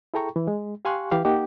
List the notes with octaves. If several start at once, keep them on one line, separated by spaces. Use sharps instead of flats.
E4 G#4 A4 G5 A#5 C#6
E3
G#3
G4 F5 G#5 C6 C#6 F#6
E3 G4 F5
A#3 D#4 G4 F#5